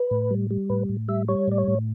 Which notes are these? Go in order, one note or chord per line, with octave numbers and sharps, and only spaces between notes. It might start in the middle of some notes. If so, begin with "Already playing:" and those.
Already playing: B4
A2
G3
G3
A2 B4
A2
G3 E5
G3 C#5
A2 D5
C#5
A2